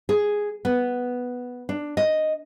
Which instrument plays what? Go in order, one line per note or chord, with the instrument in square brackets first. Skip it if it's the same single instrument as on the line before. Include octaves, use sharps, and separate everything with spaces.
[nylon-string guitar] G#4
B3
D4
D#5